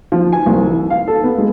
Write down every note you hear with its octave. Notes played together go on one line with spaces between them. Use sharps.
F3
G#5
C2
E3
F5
A4
B3
G#3